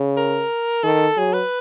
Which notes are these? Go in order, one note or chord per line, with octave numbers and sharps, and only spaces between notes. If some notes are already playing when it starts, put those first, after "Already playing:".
Already playing: C#3
A#4
D#3 A4
F#3 G#4
B4